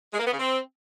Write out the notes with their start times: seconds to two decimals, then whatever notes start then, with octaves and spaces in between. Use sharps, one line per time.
0.13 G#3
0.19 A#3
0.26 B3
0.33 C#3
0.40 C4